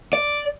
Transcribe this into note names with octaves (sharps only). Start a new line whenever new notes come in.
D5